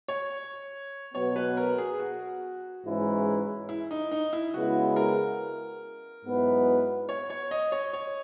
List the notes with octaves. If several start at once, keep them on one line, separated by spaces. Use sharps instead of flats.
C#5
B2 F#3 B3 C#5
B4
A#4
G#4
F#4
G#2 E3 G#3 C#4 E4
E4
D#4
D#4
E4
C#3 G#3 B3 E4 F#4
A#4
G#2 F#3 B3 E4 B4
C#5
C#5
D#5
C#5
C#5